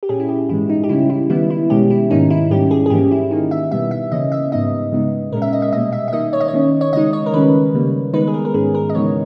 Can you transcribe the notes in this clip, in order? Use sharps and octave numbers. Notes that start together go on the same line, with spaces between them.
G4
A#2 G3 C#4 G#4
E4
G4
G#2 E3 G#3 E4
D#4
G4
C#3 G3 C#4 E4
E4
D#3 G3 B3 E4
E4
B2 G#3 C#4 G4
E4
G#2 D#3 A#3 C#4 D#4
E4
G#2 G3 C#4 G4
G#4
G#4
G#2 E3 A#3 C#4 G4
E4
D#3 A#3 D#4
E5
B2 G3 B3 E5
E5
C#3 E3 A#3 C#4 D#5
E5
G#2 G3 B3 D#4 D#5
C#3 G#3 B3 D#4
A#2 G#3 C#4 A#4
E5
D#5
E5
B2 G3 A#3 D#5
E5
E5
D#3 A#3 D#4 D#5
C#5
D#5
C#5
D#3 A#3 C#4
C#5
C#3 G#3 D#4 D#5
C#5
A#4
D#3 G3 C#4 B4
C#3 G3 A#3
D#3 G#3 B3 D#4 B4
G#4
A#4
A#4
G#2 D#3 G#3 C#4 G#4
A#4
D#5
C#3 E3 G#3 B3 D#4 C#5